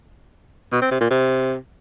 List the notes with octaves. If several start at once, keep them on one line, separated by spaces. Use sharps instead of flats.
B2
C4
C3
A#2
C3